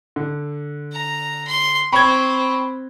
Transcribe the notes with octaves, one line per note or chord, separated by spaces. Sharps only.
D3
A#5
C6
C4 G5 B5 C#6 G#6